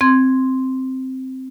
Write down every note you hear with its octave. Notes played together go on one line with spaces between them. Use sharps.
C4 C6 G#6